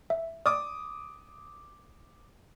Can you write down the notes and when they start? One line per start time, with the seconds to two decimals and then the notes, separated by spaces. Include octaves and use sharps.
0.10 E5
0.46 D5 D6 D#6